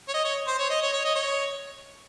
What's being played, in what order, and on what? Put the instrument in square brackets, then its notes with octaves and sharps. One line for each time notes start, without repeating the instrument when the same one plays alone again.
[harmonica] C#5
D#5
C#5
C5
C#5
D#5
C#5
C#5
D#5
C#5